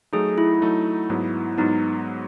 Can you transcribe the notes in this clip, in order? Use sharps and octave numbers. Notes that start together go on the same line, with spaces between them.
F#3 A3 D#4 G#4
E4
F#3 A3 D#4
G#2 F#3 B3
G#2 F#3 B3 D#4